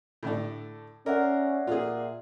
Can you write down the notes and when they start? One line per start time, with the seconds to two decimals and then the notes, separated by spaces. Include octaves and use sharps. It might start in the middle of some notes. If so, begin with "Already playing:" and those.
0.23 A2 D3 D4
1.06 C#4 A#4 D5 E5 F#5
1.67 A#2 F4 G#4